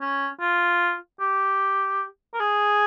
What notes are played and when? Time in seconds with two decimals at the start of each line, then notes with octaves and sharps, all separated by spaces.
0.01 C#4
0.40 F4
1.20 G4
2.34 A#4
2.40 G#4